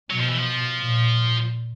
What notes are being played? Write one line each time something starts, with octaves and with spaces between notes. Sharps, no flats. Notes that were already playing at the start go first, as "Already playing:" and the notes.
B2 F#3
F3
E3
F3
A#2